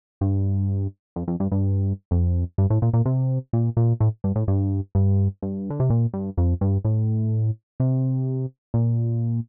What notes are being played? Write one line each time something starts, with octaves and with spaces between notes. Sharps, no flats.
G2
F2
F2
G2
G2
F2
G2
A2
A#2
A#2
C3
A#2
A#2
A2
G2
A2
G2
G2
G2
D3
C3
A#2
G2
F2
G2
A2
C3
A#2